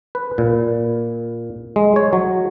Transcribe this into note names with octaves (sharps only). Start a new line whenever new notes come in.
B4
A#2
G#3
C#5
F#3